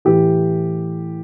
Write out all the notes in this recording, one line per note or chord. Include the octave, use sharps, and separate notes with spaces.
A2 E3 G4